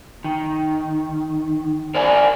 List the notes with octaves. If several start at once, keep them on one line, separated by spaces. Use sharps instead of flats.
D#3
A#4 C5 D5 F5 G#5